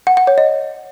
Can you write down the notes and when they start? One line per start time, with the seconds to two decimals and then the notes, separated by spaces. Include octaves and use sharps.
0.07 F#5
0.17 F#5
0.27 C#5
0.38 D#5